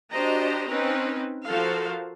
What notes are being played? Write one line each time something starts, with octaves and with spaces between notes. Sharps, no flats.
D4 F#4 G4 C5 D#5 A#5
C4 C#4 D#4 B4
F3 F#4 A4 A#4 C5 F5